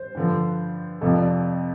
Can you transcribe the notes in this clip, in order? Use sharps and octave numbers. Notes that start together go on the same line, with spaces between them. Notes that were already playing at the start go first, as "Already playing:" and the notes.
Already playing: C5
G2 D3 F3
F2 C3 F3 A4
D5